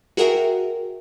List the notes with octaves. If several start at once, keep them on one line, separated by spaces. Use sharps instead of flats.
F#4 G#4 A#4 E5 F#5 G5